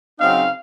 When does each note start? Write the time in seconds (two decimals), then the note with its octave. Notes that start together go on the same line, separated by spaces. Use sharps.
0.19 C#3 F#3 C4 D#4 F5